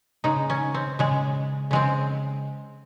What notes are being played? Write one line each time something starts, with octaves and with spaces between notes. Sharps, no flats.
C#3 G#3 D#4
C#4
C4
C#3 G#3
C#3 G#3 C4